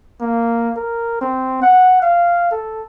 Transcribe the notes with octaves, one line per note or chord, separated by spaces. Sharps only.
A#3
A#4
C4
F#5
F5
A4